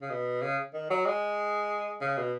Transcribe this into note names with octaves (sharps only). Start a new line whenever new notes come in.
C#3
B2
C#3
D#3
F#3
G#3
C#3
B2